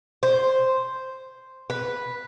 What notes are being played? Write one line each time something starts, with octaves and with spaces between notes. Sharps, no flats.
C5
B4